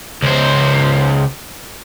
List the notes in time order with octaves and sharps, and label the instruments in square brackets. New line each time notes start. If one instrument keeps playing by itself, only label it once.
[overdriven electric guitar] C#2 C5